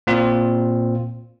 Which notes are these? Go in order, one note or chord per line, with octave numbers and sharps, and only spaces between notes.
A#2 C4 F4